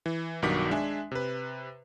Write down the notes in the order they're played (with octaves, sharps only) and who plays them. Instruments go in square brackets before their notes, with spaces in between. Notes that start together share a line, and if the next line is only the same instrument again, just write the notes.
[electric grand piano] E3
B1 G2 D#3 F#4 D6 B6
G#3 D4 E5 G#5
C3 B4